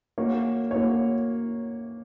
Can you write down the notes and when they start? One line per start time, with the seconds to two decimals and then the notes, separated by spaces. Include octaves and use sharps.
0.18 A#3 F#4 C#5
0.71 A#3 F#4 C#5